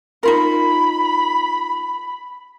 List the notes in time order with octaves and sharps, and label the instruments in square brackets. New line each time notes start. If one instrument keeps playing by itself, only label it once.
[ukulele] D#4 F4 A#4 [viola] B5